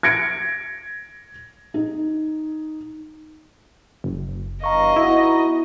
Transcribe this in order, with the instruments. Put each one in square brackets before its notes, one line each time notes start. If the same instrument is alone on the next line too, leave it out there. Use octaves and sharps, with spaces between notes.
[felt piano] G#6 A#6 C#7 D7
D#4
[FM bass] F#1
[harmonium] E2 G2 F5 [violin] D#5 [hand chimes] A#5 C#6
[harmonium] B3 D#4 F#4 [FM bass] E4